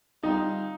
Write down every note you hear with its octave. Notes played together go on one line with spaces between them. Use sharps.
D3 G3 C4 D#4 F4